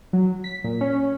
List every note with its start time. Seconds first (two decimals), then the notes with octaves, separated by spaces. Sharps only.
0.13 F#3
0.44 B6
0.64 A#2
0.81 C#4